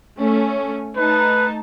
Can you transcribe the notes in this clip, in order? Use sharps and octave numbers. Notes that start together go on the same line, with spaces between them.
A3 C#4
A3 D#4 B4 A5